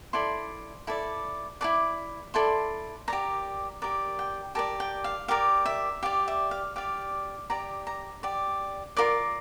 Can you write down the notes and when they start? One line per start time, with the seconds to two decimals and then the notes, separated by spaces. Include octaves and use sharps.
0.13 E4 A4 D5 C6
0.87 E4 A4 D5
1.61 E4 A4 D5 D6
2.34 E4 A4 D5 C6
3.08 G4 A#4 D5 A#5
3.82 G4 A#4 D5
4.19 G5
4.55 G4 A#4 D5 A5
4.80 G5
5.04 F5
5.28 G4 A#4 D5 F5
5.66 E5
6.03 G4 D5 F5
6.28 E5
6.51 F5
6.76 G4 D5 F5
7.50 G4 D5 A#5
7.87 A#5
8.23 G4 D5
8.96 F4 A#4 D5 D6